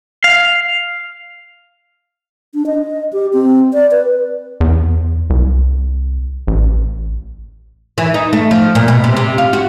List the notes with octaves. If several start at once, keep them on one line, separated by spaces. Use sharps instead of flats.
F5
D4
D#5
G4
C4
D5
B4
E2
C2
A1
E3
D#4
A3
F3
A#2
B2
C3
C3
F4
F#4